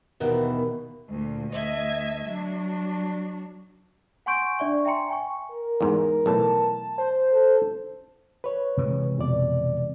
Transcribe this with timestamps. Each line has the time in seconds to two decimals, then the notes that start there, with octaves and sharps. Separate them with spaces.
0.20 D#2 B2 D#3 E3
1.10 D2 A#2
1.51 D2 D#5 E5 G#6
2.27 F#3 D4
4.26 F#5 G#5 C6 C#6 G6 D7
4.59 D4 D5 E5 C#6
4.85 E5 G5 G#5 A#5 C6 C#7
5.09 G5 G#5 C#6
5.51 A#4
5.81 E2 G#2
6.26 B1 A2 E3 A5
6.98 C5
7.32 A4
8.44 B4 C#5
8.77 C3 E3 G#3
9.18 F2 B2 D5